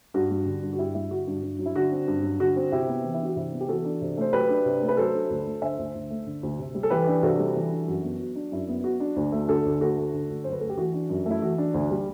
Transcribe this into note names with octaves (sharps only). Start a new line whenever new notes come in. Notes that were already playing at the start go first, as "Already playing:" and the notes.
G2 F#4
G3
D3
G2
F#4
G2 E4 G4
G3 E4
D3 F#4
G2
G2
F#3
E4
D3 F#4
C4
G2
F#3
D3 F#4
C4
C3 E4 G4
B3
E3
E4
D4 F#4
C3 E4 G4
B3
G4
E3 F#4 A4
D4
C3
A3 C5
F#3 G4 B4
D4
C3
A3
B4
F#3 A4 C5
D4
D2
A3
D3 C5 E5
D2
D2
A3
D3
D2
C3
G3
A4
E3 G4 B4
D4
C3 F#4 A4
G3
E3
D4
F#2 F#4
B3
F#3
D4
F#2 E4
B3
F#3 F#4
D4
D2
A3
D3 F#4 A4
D2
D2 F#4 A4
A3
D3
D2
F#2 C5
B4
A3 A4
G4
E3 F#4
D4
F#2
A3 E4
E3 F#4
D4
D2
G3